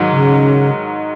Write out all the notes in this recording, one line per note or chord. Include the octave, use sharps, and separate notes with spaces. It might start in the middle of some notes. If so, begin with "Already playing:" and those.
Already playing: G#2 D#3 F#3
C#3